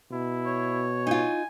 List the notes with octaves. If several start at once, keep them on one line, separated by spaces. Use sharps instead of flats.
B2 E4
C#5
D#4 F4 G#5